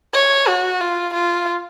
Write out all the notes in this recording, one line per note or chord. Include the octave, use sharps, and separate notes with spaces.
C#5
F#4
F4
F4